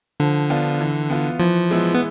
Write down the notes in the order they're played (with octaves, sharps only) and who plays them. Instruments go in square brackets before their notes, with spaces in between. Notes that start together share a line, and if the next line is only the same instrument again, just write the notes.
[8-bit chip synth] D3 [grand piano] F3
[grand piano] B3 D4 F4
E3
B3 F4
[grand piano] E3 [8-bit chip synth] F3
[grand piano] G#3 B3 E4
[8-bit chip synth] B3